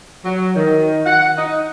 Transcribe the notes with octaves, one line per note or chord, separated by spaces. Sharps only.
F#3
D#3
F#5
D#4